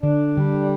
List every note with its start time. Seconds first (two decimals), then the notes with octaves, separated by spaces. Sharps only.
0.03 D3 D4
0.37 D3 G3